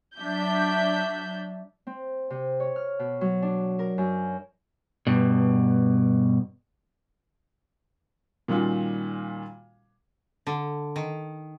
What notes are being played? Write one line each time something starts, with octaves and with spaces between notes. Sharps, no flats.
F#3 D4 E5 G6
C4
C3
C#5
F6
B2
F#3
D4
A#4
F#2
G2 B2
A#2 D#3 G3 C#4 F4 F#4
D3
D#3